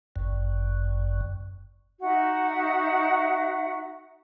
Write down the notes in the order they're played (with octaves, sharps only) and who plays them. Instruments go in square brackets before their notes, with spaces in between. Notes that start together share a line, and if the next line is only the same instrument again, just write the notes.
[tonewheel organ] G1 F#2
[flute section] D#4 F#4 E5 F#5